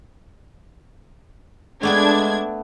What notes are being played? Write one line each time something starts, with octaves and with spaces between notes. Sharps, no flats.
G#3 A3 B3 D4 G5 G#6